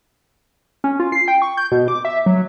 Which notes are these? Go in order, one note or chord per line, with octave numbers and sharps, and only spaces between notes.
C#4
F4
C7
G5
C#6
G6
B2
D6
E5
F#3